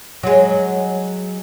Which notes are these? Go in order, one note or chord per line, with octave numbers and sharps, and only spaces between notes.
F#3 G#3